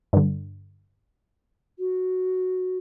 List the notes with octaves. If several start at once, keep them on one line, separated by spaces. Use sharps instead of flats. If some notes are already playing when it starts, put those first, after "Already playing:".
G2 D3
F#4